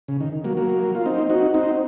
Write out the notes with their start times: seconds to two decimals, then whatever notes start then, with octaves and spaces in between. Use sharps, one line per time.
0.08 C#3
0.20 D#3
0.44 F#3 A#3
0.57 F#3 A#3
0.95 F4
1.06 C4 D#4
1.30 D#4 F#4
1.54 C4 D#4